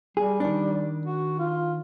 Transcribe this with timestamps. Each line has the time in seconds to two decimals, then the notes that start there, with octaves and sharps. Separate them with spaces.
0.17 G3 G#4
0.40 D#3 D4
1.05 F#4
1.39 F4